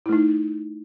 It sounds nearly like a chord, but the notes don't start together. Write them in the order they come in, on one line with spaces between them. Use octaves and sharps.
E4 A3 D#4